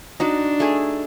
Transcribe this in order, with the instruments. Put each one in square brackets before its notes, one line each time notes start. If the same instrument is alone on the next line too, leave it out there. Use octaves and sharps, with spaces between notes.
[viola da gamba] D4 [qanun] D#4 F#4
[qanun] A3 G#4